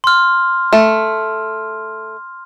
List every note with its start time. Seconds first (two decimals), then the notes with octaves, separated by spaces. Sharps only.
0.04 C6 F6
0.73 A3